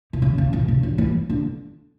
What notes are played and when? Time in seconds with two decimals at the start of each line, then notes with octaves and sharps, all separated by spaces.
0.13 B2
0.22 C#3
0.38 C#3
0.53 B2
0.68 C#3
0.83 D3
0.98 E3
1.30 D3